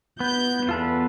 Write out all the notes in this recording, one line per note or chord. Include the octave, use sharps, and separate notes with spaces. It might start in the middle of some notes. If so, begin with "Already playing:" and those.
B3 G6
E2 F4 A4 B4